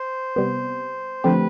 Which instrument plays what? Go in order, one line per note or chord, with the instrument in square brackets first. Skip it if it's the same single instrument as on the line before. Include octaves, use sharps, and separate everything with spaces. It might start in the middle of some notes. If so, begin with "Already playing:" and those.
Already playing: [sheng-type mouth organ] C5
[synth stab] C3 G3 B3
[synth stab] D3 F3 A3 C4 G4 [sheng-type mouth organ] B4